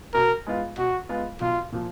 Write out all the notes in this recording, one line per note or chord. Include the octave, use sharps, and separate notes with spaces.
B2 A#4
G#3 B3 F4
B2 F#4
G#3 B3 F4
B1 F4
A#2 F3